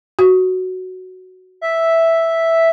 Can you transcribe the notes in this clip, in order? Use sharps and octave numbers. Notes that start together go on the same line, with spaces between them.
F#4
E5